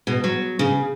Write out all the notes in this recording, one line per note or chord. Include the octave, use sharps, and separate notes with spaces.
B2
F#3
C#3